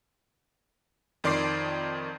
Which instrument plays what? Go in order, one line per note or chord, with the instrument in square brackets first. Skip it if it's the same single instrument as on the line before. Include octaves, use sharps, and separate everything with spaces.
[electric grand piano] F2 D#3 D5 C6 D6 C7